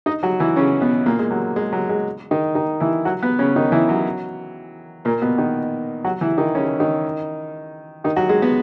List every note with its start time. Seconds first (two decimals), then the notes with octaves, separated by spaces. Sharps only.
0.06 D#4 D#5
0.23 F#3 F#4
0.40 E3 E4
0.56 C#3 C#4
0.81 B2 B3
1.06 A#2 A#3
1.19 G#3
1.31 F#3
1.56 G#3
1.73 F#3
1.89 G#3
2.31 D#3 D#4
2.55 D#3 D#4
2.80 E3 E4
3.05 F#3 F#4
3.23 B3 B4
3.39 C#3 C#4
3.56 D#3 D#4
3.72 E3 E4
3.89 F#3
5.05 A#2 A#3
5.21 B2 B3
5.38 D#3 D#4
6.04 F#3 F#4
6.21 E3 E4
6.38 D#3 D#4
6.55 C#3 C#4
6.80 D#3 D#4
8.04 D#3 D#4
8.17 F#3 F#4
8.29 G#3 G#4
8.42 B3 B4